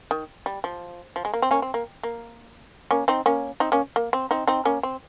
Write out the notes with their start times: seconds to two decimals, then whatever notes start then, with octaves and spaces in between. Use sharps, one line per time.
0.11 D#3
0.46 G3
0.64 F3
1.16 F3
1.25 G#3
1.34 A#3
1.42 C4
1.51 A#3 C#4
1.62 C4
1.74 A#3
2.03 A#3
2.91 A#3 C#4
3.08 C4 D#4
3.26 A#3 C#4
3.60 C4 D#4
3.72 A#3 C#4
3.96 A#3
4.13 C4
4.31 C4 D#4
4.47 C4 D#4
4.65 A#3 C#4
4.83 C4